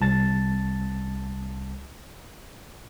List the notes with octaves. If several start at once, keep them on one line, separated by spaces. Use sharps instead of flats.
C2 A5 A6